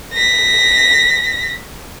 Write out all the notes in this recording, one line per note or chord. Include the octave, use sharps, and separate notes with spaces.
A#6 B6